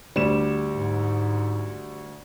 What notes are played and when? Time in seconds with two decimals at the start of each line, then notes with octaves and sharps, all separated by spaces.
0.16 D2 G3 E7
0.74 G#2